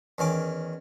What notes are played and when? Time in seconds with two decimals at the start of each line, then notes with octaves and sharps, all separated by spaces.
0.18 E2 D#3 C#4 D6